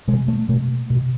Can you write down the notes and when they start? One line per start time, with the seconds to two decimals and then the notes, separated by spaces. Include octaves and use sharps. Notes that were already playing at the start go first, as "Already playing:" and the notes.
0.08 B2 G#3
0.28 A3
0.49 B2 A3
0.90 B2